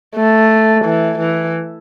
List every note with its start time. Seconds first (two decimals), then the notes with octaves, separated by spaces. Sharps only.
0.16 A3
0.85 E3
1.19 E3